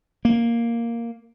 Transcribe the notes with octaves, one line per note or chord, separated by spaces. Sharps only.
A#3